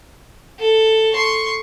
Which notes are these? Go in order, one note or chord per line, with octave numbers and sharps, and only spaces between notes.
A4
C6 C#6